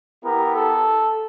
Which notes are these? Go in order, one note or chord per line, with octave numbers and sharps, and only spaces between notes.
B3 E4 G4 A#4
A4